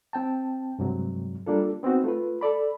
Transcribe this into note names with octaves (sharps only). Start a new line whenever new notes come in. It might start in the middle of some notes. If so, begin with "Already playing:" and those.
C4 G5 A5
G2 C3 F#3 G#3
G3 A#3 D4 F4 A4
B3 C4 D#4 F#4
A3 F4 B4
A4 D5 B5